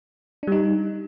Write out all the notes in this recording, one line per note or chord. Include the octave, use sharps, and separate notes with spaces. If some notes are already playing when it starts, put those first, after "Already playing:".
G3 D4 D#4